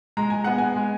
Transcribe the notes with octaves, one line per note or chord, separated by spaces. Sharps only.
G#3 A#5
G#5
B3 F#5
G#5
G#3